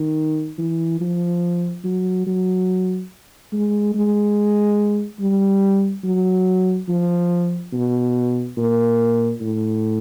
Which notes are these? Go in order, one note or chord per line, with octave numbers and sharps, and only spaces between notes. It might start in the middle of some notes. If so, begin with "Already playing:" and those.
Already playing: D#3
E3
F3
F#3
F#3
G#3
G#3
G3
F#3
F3
B2
A#2
A2